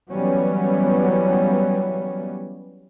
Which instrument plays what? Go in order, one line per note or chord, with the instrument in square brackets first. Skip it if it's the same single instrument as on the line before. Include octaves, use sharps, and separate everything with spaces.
[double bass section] E3 F#3 G3 B3 C#4